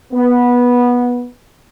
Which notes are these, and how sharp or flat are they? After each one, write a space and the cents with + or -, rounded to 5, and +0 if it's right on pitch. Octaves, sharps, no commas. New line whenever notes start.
B3 -15